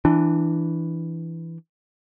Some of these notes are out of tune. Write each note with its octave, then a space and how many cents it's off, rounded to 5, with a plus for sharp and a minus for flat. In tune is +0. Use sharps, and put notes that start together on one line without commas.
E3 +0 D4 +10